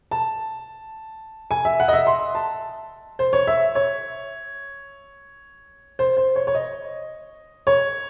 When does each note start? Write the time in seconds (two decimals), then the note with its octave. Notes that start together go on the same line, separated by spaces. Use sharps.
0.11 A5
1.51 G#5
1.65 E5
1.80 F#5
1.88 D#5
1.93 E5
2.07 C6
2.35 A5
3.19 C5
3.33 C#5
3.47 E5
3.75 C#5
5.99 C5
6.17 C5
6.36 C#5
6.47 C#5
6.55 D#5
7.67 C#5